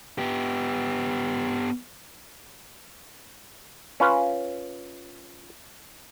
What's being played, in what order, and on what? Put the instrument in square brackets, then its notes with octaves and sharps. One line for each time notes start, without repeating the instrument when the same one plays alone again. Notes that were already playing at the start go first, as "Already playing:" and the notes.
[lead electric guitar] B3 G4
[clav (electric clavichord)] C#4 F4 B4